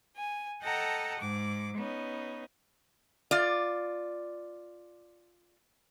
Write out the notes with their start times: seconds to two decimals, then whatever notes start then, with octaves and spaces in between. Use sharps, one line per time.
0.17 G#5
0.62 A4 D#5 F#5 G5 A5 A#5
1.19 G#2 D6
1.77 B3 C#4 D#4
3.31 F4 D5